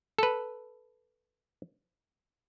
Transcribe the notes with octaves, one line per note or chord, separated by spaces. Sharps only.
A4 B4